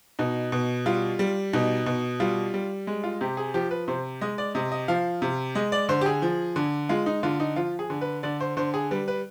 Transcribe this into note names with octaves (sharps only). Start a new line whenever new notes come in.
B2 D#4
B2
G3 F4
G3
B2 D#4
B2
G3 F4
G3
G#3
F4
C3 G4
G#4
F3 G4
B4
C3 C5
G#3 D#5
D5
C3 D#5
D#5
F3 F5
C3
G#3 D#5
D5
D3 C5
G4
G#4
F3
D3
G#3 F4
D#4
D3 F4
D#4
F3 F4
G#4
D3
B4
D3 D5
C5
D3 C5
G#4
G3 B4
B4